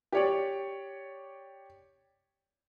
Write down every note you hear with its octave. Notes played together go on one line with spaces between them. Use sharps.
G4 C#5 D5